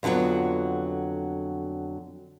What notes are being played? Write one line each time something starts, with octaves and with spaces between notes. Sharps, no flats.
F2 D3 E3 F#3 B3